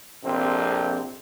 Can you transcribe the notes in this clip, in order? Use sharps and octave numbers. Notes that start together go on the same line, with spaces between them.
A#1 F2 C3 C4